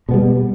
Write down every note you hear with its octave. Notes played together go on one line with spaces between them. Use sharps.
B2 G3 B3